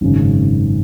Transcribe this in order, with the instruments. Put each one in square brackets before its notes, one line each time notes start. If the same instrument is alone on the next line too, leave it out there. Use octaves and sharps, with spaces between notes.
[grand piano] G#1 F#2 C#3